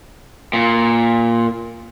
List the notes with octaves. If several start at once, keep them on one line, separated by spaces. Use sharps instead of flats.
A#2